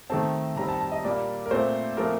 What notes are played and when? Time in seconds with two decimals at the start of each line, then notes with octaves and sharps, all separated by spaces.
0.10 D#3 A3 C4 A5
0.56 D#3 G3 C4 A#5
0.68 A5
0.81 A5
0.92 D#5
1.04 A#2 G3 A#3 D5
1.46 A#4
1.51 A#2 A3 C4 C5
1.97 A#2 F3 A3 C4 A#4